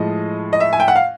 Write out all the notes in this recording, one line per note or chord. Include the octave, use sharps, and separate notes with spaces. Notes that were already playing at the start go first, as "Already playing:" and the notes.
Already playing: A2 F3 G#3 D#5
D#5
E5
G#5
G5
F#5
F5